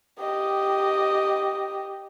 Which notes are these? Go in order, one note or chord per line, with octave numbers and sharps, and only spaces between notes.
G4 D#5